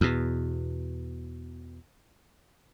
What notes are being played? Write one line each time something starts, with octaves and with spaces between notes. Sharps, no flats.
E2 B2